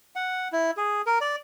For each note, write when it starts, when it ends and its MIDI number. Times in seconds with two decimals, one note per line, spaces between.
0.16 0.48 78
0.52 0.71 64
0.77 1.02 68
1.06 1.19 70
1.21 1.36 74